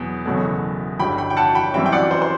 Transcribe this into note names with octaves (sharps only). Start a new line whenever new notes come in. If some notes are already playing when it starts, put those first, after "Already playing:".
Already playing: E2 B2 F#3 B3
F#1 E2 B2 F#3 A3
G1 G2 D3 G5 B5
G5 B5
G5
F#5 A5
G5 B5
F#2 E3 G3 C4 E5 G5
G5
D5 F#5
C5
C5